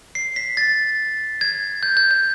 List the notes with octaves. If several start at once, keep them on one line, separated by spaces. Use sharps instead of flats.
C7
B6
A6
G#6
G6
G6
G6